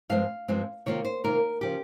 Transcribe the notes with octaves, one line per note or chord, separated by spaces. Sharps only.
G2 F3 G#3 C4 F5
G2 F3 G#3 C4
C3 D#3 A#3 F4 C#5
C5
C3 D#3 A#3 F4 A#4
C#3 F3 G4